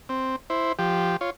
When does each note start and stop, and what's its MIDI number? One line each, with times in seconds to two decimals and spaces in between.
0.09 0.36 60
0.50 0.72 64
0.50 0.72 72
0.79 1.16 53
0.79 1.16 67
1.21 1.30 65
1.21 1.30 73